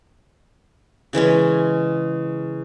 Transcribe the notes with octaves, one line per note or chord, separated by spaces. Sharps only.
C#3 E3 G#3 C#4